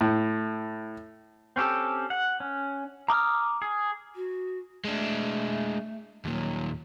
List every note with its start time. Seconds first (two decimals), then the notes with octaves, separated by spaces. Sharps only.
0.01 A2
1.56 C4 C#4 G4 A4
2.10 F#5
2.40 C#4
3.08 A#5 D6 D#6 F6
3.62 G#4
4.15 F#4
4.84 G#3 A3 D4
6.25 D#2 A#2 F#3